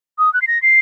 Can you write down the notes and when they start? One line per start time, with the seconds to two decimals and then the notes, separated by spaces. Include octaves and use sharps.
0.19 D#6
0.34 F#6
0.42 C7
0.47 A#6
0.62 C7